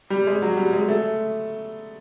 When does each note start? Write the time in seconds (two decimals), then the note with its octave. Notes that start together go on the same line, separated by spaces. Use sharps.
0.10 G3
0.27 G#3
0.42 F#3
0.57 G3
0.73 G#3
0.88 A3